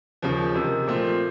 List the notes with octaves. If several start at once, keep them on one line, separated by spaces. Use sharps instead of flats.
D#2 C#3 F3
C3 D#3 G#3
A#2 F3 A3 C4 F4